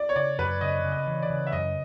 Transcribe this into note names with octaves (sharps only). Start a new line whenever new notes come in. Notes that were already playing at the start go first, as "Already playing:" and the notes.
Already playing: D5
C#5
C#3 D5
F#2 B4
C#3 D#5
C#3
D#5
E3
D5
C#3
E5
F#2 D#5